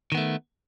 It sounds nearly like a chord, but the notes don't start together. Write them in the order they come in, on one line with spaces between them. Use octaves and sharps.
D#3 B3 A3